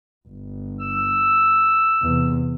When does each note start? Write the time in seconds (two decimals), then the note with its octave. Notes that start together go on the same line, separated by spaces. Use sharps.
0.28 G1
0.80 E6
2.02 E2 C3